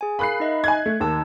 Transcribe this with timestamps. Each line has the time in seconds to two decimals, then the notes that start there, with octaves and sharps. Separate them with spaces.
0.01 G#4 G#5
0.19 A#4 F5 B5 F#6 C7
0.40 D#4 D#5 E5
0.64 G#5 F#6 G#6
0.86 A3
1.00 D#2 D#4 A5 E6